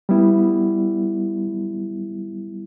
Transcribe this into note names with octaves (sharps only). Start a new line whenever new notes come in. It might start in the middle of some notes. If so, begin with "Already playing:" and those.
G3 B3 E4